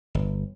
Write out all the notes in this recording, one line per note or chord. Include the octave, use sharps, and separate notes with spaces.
G1